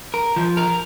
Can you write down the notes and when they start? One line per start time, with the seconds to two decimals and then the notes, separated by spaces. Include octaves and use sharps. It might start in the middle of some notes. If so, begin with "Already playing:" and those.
0.14 A#4
0.36 F3
0.57 A#4